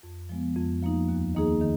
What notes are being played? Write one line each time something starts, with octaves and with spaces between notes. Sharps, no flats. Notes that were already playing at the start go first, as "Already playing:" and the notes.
F2
F3 G#3 B3
F2
F3 A#3 D#4
D#2
D#3 A#3 D#4 G#4
D#3